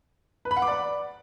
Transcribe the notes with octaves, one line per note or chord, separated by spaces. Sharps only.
B4
B5
F#5
D6
D5